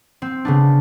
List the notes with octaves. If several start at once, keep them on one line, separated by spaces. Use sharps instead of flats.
C4
C#3 B3 D4